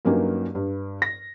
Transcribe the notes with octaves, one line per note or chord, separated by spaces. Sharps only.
G2 F#3 A#3 C#4 D#4 G4
G2
A#6